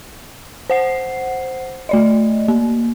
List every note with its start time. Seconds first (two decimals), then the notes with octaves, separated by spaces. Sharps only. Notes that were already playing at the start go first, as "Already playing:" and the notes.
0.70 C5 F#5 C7
1.89 A3 D5 D#5
2.48 A#3